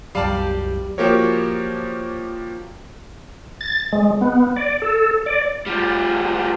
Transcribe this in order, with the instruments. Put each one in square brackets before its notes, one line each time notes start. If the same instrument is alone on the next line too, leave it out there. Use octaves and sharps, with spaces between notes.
[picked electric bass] C2 F#2 F#3 [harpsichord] G3 [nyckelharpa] G4 [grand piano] F5 A5
[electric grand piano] F3 A#3 F#4 G4 A#4 C#5
[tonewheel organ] A6
G#3
B3
D5
A4
D5
[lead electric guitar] F3 G3